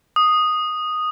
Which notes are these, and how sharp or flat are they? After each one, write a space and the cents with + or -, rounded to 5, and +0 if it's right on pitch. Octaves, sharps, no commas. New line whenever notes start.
D#6 -5